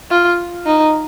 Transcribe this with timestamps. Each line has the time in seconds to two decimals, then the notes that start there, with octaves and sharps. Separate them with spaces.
0.11 F4
0.66 D#4